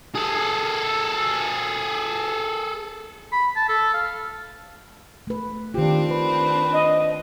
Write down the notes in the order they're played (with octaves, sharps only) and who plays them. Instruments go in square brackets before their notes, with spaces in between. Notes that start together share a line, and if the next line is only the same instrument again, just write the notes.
[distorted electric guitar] G#4 A4
[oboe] B5
A5
A4
F5
[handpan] A3 B4
[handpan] D#3 F4 [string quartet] C4 D4 [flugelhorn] G4
[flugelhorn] B4
[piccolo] D#5